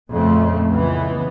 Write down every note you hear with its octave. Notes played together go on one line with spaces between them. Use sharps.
F2 A#2 C#3 A3
C#2 E3 B3